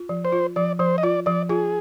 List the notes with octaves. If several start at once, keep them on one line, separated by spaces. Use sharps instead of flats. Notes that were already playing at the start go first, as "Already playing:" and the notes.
Already playing: F4
F3
C5
F4
F3 D5
F3 C5
D#5
F4 D5
F3 D5
F4 G#4